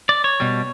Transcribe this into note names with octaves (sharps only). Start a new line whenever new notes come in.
D5
C#5
B2 G3